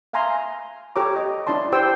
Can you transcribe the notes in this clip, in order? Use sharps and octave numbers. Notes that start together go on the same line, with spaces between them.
E5 F5 G#5 A#5 C6
G4 A4 C#5 A#5 D6
D#5
D4 E4 D5 A5 C6
G4 C5 G5 E6